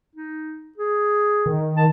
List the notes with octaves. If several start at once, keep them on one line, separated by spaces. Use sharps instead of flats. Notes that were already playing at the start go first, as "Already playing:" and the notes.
D#4
G#4
D#3
A5